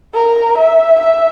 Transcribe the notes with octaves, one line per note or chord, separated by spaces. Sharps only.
A#4
E5
E5